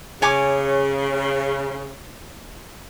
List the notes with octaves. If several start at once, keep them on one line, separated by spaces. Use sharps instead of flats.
C#3 C#5 G#5 D6